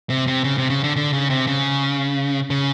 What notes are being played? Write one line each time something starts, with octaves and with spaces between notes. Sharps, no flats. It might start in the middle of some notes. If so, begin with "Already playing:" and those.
C3
C3
C#3
C3
C#3
D3
D3
C#3
C3
C#3
C#3